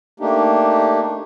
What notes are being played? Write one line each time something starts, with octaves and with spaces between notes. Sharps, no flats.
A3 A#3 D4 D#4 G4